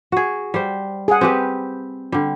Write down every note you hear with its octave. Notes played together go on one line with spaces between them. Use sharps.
F#4 G#4
G3 C5
G#4 F#5
C4 G4 B4
D3 G3